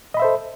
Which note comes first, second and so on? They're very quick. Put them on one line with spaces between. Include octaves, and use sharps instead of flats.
D#5 B5 E5 C5 A4